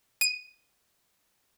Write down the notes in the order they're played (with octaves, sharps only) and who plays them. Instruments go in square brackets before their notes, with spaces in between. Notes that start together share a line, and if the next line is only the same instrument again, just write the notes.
[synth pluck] D#7